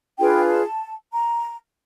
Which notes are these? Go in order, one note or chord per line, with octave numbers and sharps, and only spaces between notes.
D4 F4 G#4 B4 G5
A5
A#5